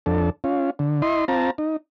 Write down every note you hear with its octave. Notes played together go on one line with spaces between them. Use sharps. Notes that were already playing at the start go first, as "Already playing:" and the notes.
F2 D4 A4
C#4 F4
D3
E4 D#5 C6
C4 F4 A5 A#5
D#4